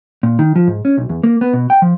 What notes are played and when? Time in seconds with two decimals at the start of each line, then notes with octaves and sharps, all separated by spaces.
0.23 A#2
0.39 D#3
0.56 F3
0.67 G#2
0.85 C#4
0.97 B1
1.09 E2
1.23 A#3
1.41 B3
1.53 B2
1.70 G5
1.82 F3